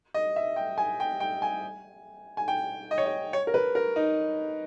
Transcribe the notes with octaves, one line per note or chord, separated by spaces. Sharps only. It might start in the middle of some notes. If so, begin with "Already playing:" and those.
D#5
E5
G5
G#5
G5
G5
G#5
G#5
G5
D#5
C#5
D#5
C#5
A#4
B4
A#4
D#4